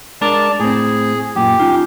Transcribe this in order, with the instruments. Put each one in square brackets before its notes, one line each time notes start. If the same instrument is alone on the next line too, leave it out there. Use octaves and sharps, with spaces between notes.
[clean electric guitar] G#3 D4 A#4 [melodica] D5 A5
[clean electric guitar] A2 C4 [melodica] G#4
[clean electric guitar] F#2 A#2 [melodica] G4
[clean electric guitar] C#4 D#4 F4